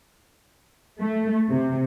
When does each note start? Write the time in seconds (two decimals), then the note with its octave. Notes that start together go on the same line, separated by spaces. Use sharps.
0.99 A3
1.50 C3